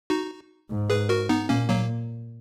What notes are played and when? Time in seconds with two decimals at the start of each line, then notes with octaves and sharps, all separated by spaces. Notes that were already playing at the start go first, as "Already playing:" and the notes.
0.10 D#4 F#4
0.70 G#2
0.90 G#4 B4
1.09 F#4 A#4
1.29 B3 D#4
1.49 A#2 A#3 C#4
1.69 F#3 A#3